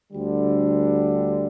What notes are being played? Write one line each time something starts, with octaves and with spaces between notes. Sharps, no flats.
D2 D3 G3